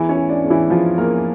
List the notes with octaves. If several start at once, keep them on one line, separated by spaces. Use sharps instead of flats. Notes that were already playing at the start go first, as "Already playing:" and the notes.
Already playing: E2 E3 E4
C#4 C#5
E3
D4 D5
E2
E3 E4
E2 F3 F4
E2 A#3 A#4